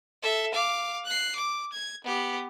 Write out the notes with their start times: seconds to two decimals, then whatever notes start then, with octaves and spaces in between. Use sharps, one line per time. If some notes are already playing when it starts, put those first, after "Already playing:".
0.22 A4 E5
0.54 F5 D6
1.06 F#6 C7
1.36 D6
1.73 G#6
2.04 B3 G4